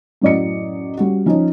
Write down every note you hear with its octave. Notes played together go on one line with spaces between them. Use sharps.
F#2 A2 F#3 D5 D#5 C#7
G3 C#4 F#4
F3 C#4 D#4